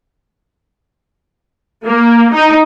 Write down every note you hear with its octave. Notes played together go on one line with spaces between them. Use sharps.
A#3
D#4